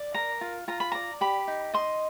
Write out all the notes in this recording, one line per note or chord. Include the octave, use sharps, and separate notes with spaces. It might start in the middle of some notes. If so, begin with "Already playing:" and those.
Already playing: D5
A#4 A#5
F4
F4 A#5
B5
D5 A#5
G4 B5
D#4
D#5 C6